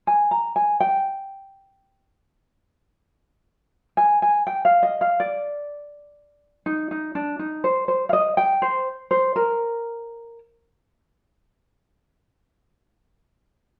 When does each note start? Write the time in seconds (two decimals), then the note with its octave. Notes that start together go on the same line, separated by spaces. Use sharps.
0.07 G#5
0.31 A#5
0.56 G#5
0.80 G5
3.97 G#5
4.22 G#5
4.47 G5
4.65 F5
4.83 D#5
5.01 F5
5.20 D5
6.66 D#4
6.91 D#4
7.15 D4
7.39 D#4
7.64 C5
7.88 C5
8.09 F5
8.13 D#5
8.37 G5
8.62 C5
9.11 C5
9.36 A#4